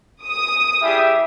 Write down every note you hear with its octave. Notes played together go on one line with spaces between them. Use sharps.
D#6
G3 E4 G4 G#4 E5